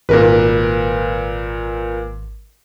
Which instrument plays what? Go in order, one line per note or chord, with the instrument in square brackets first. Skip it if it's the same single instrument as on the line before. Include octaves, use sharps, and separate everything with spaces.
[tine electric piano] G#1 [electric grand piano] A#2 A#4 B4